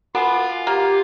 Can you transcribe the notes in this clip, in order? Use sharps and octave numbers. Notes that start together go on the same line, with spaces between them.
B3 F4 F#4 F5 F#5 G#5
A#3 G4